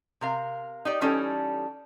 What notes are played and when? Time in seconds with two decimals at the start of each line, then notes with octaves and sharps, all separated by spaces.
0.21 C3 A#4 F5
0.85 D#4 G4 D5
1.01 E3 G3 C#4 D#4 G4 A4